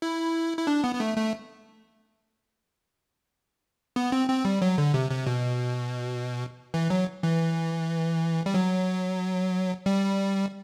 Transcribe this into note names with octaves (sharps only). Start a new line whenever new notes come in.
E4
E4
D4
B3
B3
A3
A3
B3
C4
C4
G3
F#3
D3
C3
C3
B2
E3
F#3
E3
G3
F#3
G3